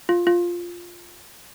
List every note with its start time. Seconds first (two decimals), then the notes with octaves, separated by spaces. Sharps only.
0.09 F4
0.27 F4